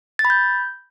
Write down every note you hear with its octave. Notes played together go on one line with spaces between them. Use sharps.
A6
B5
G6